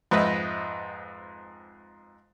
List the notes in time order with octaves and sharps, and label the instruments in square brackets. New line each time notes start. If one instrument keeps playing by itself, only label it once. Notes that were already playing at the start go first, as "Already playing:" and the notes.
[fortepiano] F2 G#2 B4 D#5 E5